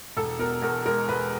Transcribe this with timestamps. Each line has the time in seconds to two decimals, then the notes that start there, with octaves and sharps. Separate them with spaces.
0.17 E1 A4
0.39 B2 A#4
0.62 E2 A#4
0.85 G#3 A#4
1.08 E1 B4